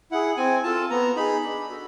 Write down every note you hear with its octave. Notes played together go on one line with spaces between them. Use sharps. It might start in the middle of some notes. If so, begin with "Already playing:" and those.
E4 G#4 F#5
C4 G#5
F4 A4 A5
B3 A#5
D#4 G#4 B5
D4
F#4 A4